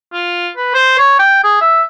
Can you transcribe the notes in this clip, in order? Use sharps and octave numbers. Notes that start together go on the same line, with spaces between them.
F4
B4
C5
C#5
G5
G#4
E5